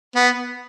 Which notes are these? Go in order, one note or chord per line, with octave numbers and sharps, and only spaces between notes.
B3